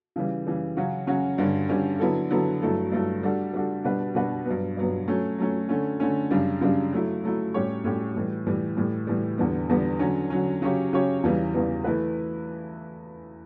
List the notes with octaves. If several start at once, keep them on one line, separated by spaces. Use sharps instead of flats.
C#3 E3 G3
C#3 E3 G3
C#3 F#3 C#4 F#4
C#3 F#3 C#4 F#4
G2 D3 G3 C#4
G2 D3 G3 C#4
D3 F#3 B3 E4 A4
D3 F#3 B3 E4 A4
G2 F#3 A3 E4 A4
G2 F#3 A3 E4 A4
G3 D4 F#4 A4
G3 D4 F#4 A4
B2 G3 D4 F#4 B4
B2 G3 D4 F#4 B4
G2 F#3 B3
G2 F#3 B3
F#3 A3 C#4
F#3 A3 C#4
D3 A3 C#4
D3 A3 C#4
F#2 C#3 G3 D4
F#2 C#3 G3 D4
F#3 A3 E4
F#3 A3 E4
A2 G3 C#4 G4 C#5
A2 G3 C#4 G4 C#5
A2 E3 G3
A2 E3 G3
A2 E3 G3
A2 E3 G3
E2 D3 G3 B3
E2 D3 G3 B3
D3 F#3 C#4
D3 F#3 C#4
C#3 F#3 C#4 G4 C#5
C#3 F#3 C#4 G4 C#5
E2 C#3 E3 G3 B3
E2 C#3 E3 G3 B3
E3 A3 E4 B4